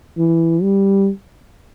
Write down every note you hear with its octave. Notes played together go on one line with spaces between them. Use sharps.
E3
G3